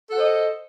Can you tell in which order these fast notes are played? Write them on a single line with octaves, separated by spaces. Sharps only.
A4 F#5 C5 D#5